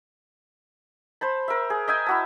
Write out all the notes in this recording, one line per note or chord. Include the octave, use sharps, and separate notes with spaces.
C5 A5 B5
A#4 E5
G#4
D#5 E5 G5 G#5
E4 F#4 A5